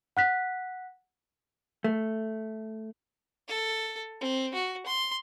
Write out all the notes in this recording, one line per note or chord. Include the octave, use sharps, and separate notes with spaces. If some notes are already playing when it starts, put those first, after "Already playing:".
F#5 F#6 B6
A3
A4
C4
F#4
C6